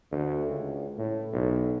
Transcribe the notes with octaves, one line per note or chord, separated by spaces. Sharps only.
D2
C#2
A2
B1